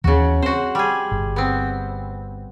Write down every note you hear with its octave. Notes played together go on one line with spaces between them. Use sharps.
D#2 C#3 E3 F#4
C4 F#4 C5
G3 G#4
G1
B3 C4